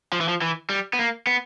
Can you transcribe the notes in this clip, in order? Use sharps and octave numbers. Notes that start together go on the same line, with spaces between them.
F3
E3
F3
E3
G3
B3
A#3
B3